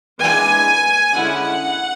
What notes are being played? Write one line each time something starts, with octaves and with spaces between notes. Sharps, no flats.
E3 G#3 D4 G#5
D3 G#3 C#4 E4 F#5